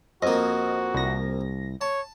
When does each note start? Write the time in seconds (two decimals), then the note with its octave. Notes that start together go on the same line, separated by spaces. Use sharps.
0.23 F2 A#3 F#4 D#5
0.94 C2 A#6
1.81 C#5 A5